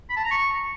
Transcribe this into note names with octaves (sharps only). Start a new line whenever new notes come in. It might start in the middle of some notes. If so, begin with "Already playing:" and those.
B5
A5
A#5
C#6